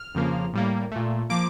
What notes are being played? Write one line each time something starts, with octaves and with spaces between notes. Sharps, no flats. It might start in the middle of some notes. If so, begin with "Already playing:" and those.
Already playing: F6
F2 C#3 F3 A#3
A2 G3 A#3
A#2 A3
F3 A#3 D6